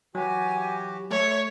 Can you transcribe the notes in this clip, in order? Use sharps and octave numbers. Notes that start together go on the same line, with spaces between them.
E3 F#3 F#4 G4 G#5
A3 C#5 E5